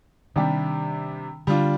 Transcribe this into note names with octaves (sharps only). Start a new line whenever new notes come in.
C3 D#3 G3 D4 G4
D3 G3 D4 F4